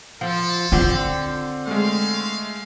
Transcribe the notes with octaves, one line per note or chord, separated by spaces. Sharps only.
F3 A4
D3 C4 F4
G#3 A3 F5